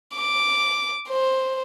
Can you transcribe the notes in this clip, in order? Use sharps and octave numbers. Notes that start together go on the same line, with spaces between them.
D6
C5